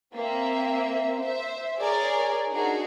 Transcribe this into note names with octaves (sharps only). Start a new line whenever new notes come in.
A#3 C4 E5
C5 E5
G#4 A#4 C#5 D5 G#5
D4 D#4 F#4 G#4 A#4